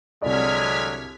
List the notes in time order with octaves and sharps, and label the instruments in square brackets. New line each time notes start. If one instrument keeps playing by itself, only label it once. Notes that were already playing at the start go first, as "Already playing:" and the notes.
[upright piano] C2 D5 [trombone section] D3 F#3 G#3 [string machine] F6 G#6 B6